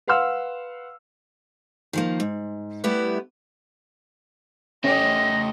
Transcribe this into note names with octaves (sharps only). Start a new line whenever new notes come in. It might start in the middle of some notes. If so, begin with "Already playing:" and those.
B4 F5 F#5 C6 E6 F6
D#3 F3 A#3
G#2
G3 A3 B3 E4 G4 B4
A3 C#4 G4 C5 D#5 A#6